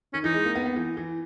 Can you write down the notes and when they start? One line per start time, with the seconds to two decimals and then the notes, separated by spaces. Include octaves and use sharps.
0.13 D#3 C#4
0.24 E3 D#4
0.34 G#3
0.45 A#3
0.55 B3
0.66 B3
0.76 E3
0.97 E3